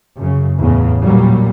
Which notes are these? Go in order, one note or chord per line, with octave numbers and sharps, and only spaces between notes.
F#2 C#3
E2 A2 C#3
A#2 F#3 G3 A#3